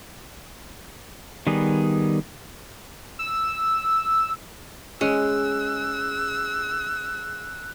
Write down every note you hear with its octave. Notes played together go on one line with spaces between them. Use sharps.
D#3 G3 B3 G#4
E6
G#3 C#4 E6 F#6